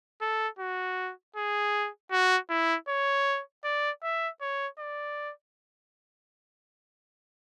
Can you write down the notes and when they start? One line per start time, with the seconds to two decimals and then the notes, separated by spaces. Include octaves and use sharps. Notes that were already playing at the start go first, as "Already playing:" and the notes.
0.21 A4
0.59 F#4
1.36 G#4
2.11 F#4
2.50 E4
2.88 C#5
3.64 D5
4.03 E5
4.41 C#5
4.79 D5